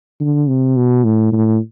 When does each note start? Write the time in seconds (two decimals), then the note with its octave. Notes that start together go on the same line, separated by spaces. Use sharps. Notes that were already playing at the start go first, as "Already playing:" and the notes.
0.21 D3
0.49 C3
0.76 B2
1.04 A2
1.33 A2